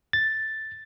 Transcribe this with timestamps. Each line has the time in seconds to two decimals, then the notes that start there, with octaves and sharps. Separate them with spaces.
0.13 A6